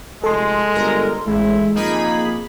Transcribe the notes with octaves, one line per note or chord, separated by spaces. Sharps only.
F1 G#3 A4 C6
G1 A#4
A1 G#3 E4
F2 A#3 D#4 G#4 B5